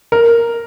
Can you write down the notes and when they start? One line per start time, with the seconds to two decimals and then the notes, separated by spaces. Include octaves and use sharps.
0.12 A#4